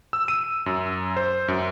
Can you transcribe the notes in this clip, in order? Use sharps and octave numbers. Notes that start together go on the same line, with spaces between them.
E6
D#7
F#2
C5
F#2